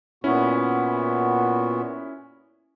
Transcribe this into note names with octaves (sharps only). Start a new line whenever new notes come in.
A#2 B3 C#4 E4 F#4